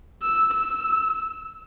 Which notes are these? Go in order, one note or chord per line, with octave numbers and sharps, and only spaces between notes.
E6
E6